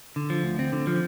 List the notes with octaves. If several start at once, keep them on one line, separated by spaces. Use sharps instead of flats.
D3
F3
D2
C4
D3
F3